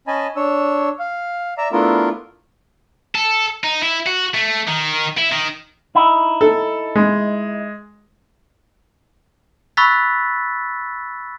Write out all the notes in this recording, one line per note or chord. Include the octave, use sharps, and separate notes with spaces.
C#4 D#5 G#5 A5 B5
D4 C#5 E6
F5
D5 E5 A#5
A3 B3 D4 E4 F4 A#4
A4
D#4
E4
F#4
A3
D#3
E4
D#3
D#4 E4
A4
G#3
B5 C#6 E6 F#6 A6 B6